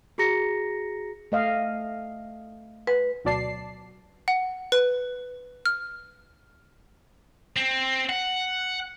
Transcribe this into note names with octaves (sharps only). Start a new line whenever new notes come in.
F#4 G#4 A#5 A#6 C#7
A3 D#5 F5
B4
D2 B2 F#3 D5 A5 C7
F#5
B4
F6
C4
F#5